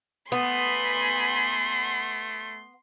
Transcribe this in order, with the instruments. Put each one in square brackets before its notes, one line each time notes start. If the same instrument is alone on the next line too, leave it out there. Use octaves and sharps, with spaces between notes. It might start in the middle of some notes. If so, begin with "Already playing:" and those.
[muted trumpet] A3 [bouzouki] B3 [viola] G#5 B5 [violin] C6